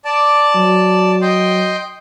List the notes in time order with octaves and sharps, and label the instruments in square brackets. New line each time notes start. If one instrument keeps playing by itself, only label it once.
[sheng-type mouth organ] D5 A5 [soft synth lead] D6
[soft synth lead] F#3
[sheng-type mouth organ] D#5 G5 C6